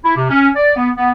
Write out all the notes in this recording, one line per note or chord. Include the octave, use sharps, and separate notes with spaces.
E4
C3
C#4
D5
B3
B3